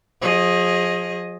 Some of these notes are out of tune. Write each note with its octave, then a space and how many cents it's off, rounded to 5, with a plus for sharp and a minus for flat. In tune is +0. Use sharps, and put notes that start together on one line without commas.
F3 +35 G#4 +0 D#5 +0